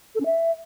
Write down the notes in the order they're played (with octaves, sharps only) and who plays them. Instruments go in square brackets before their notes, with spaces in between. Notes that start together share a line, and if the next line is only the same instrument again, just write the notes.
[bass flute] A4
C#4
E5